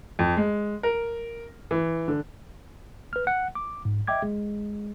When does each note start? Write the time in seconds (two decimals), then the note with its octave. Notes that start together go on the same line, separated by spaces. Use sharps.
0.19 F2
0.37 G#3
0.83 A#4
1.71 E3
2.08 D3
3.13 B4 F6
3.27 F#5
3.55 D6
3.85 G#2
4.07 D#5 E5 G5 D6 G#6
4.23 G#3